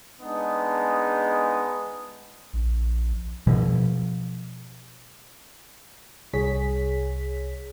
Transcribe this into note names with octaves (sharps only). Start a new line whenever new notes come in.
G#3 B3 D4 D#4
A#1
B2 F3
C2 G#4 C#5 B6